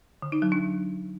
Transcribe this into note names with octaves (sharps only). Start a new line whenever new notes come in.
D3
D#4
F#3
D4